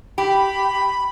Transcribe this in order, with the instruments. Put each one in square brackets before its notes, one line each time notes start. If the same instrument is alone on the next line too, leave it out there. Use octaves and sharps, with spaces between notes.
[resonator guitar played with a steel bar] G4 [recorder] B5